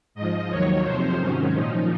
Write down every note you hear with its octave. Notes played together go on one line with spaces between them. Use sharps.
G#2 F3 D#5
D#2 D#3 F#3 C#5
F2 C3 F3 C5
G#2 D#3 F#3 C#4
A#2 F3 D#4